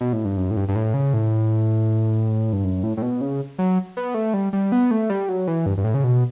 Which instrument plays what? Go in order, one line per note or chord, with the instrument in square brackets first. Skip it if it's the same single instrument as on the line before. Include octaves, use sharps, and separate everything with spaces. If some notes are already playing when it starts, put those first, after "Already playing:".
[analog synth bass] B2
A2
G2
F#2
A2
G2
G2
A2
C#3
A2
G2
F#2
A2
A2
B2
C#3
F#3
B3
A3
G3
G3
B3
A3
G3
F#3
E3
G2
G2
A2
C#3
B2